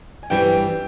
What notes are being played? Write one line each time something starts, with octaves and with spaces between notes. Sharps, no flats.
G#5
G2 E3 G3 C4 G5